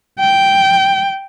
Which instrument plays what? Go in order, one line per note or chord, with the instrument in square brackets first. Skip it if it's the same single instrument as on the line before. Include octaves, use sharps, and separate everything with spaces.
[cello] G5